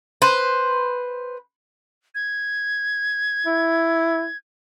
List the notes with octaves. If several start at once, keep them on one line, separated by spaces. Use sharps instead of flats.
B4 C5
G#6
E4